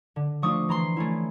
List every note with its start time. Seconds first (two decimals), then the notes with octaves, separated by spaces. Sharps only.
0.16 D3
0.42 F3 A3 D4 F4 C#6 D#6
0.69 E3 A#5 C6
0.97 A3 C#4 E4